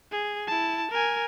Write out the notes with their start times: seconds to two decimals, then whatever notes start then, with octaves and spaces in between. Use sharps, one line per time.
0.11 G#4
0.47 E4 A5
0.91 A#4 G#5